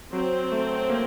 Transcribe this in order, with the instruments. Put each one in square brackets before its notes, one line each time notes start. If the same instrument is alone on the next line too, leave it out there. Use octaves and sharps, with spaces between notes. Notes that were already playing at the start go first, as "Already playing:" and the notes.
[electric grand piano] F#3 [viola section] C4
[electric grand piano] A3
A#3